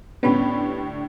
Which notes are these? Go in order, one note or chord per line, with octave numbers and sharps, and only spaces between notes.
A2 D3 G3 B3 C#4 B5